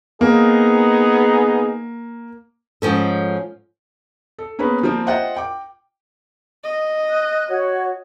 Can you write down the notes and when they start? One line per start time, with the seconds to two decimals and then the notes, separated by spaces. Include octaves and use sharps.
0.21 A#3 B3 D#4 G#4
2.82 G#2 F3 C#4 A4
4.39 A4
4.59 A#3 B3 C#4 G#4 B4
4.83 F3 G3 A#3 C4
5.07 F4 C5 D#5 E5 F#5 G5
5.36 G5 D6
6.63 D#5
7.10 F#6
7.49 F#4 C#5